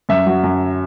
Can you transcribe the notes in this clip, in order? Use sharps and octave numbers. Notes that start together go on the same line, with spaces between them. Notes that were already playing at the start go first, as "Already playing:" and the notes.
F#2 E5
F#3
F#2